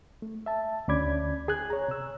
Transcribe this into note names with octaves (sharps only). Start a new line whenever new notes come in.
A3
E5 A5
D2 C#4 D5 B5 D6 G#6
G#4 G#5 F#6 G#6
C#5 A#5
C3 E6